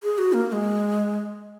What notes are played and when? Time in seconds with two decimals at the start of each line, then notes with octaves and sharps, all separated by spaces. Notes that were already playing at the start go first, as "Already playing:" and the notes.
0.03 G#4
0.18 F#4
0.33 A#3
0.49 A#3
0.52 G#3